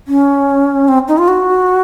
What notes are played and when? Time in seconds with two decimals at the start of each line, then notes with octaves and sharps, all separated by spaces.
0.08 C#4
0.88 C4
1.08 D#4
1.18 F4
1.28 F#4